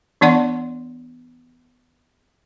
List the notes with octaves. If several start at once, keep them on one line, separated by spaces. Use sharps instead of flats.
E3 B3 D4 D5 F#5 C6